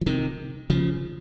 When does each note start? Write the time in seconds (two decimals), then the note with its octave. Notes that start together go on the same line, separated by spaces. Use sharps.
0.01 F3
0.06 C3 D#3
0.70 C#3 F3